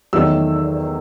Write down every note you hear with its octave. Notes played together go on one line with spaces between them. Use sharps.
E2 D#3 F#3 A3 E6